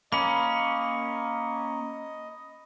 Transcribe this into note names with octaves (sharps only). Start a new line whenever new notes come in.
A#3 C#4 D#5 B5